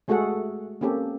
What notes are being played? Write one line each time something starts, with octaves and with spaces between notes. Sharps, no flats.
G#3 A3 F#4 G#4 A4 F#5
A#3 C4 C#4 G4 A4